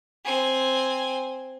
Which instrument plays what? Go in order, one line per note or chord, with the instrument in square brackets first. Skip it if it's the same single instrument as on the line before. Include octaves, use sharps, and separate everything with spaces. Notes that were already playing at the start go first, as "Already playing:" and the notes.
[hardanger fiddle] C4 G#5